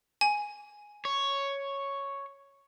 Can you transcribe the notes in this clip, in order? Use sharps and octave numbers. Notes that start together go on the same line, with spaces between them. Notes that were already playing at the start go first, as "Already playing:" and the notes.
G#5
C#5